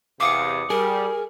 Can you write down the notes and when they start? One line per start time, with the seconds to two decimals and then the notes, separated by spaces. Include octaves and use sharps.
0.20 E2 C3 F5 D6 D#6 C#7
0.70 G3 G#4 A#4